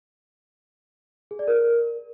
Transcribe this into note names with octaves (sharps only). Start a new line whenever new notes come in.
G#4
D5
A#4